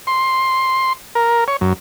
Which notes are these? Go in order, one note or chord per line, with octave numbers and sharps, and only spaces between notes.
C6
A#4
C#5
F#2